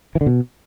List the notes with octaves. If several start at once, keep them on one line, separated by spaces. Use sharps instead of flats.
E3
D3
B2